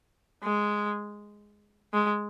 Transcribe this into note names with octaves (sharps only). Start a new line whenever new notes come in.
G#3
G#3